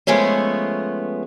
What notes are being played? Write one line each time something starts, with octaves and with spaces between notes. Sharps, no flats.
F3 G#3 A3 B3 C#4